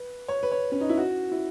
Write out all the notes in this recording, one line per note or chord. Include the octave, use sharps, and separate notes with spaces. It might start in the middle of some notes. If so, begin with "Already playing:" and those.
Already playing: B4
C#5
B4
C#5
C#4
D#4
E4
F#4
E4